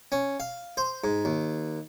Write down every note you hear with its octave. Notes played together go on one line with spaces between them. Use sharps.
C#4
F5
C5
G#2
D#2